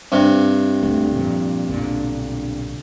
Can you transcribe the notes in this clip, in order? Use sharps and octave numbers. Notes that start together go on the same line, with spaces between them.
G2 C3
D#1 D2 A3
F2 A#2
B1 A#2 D3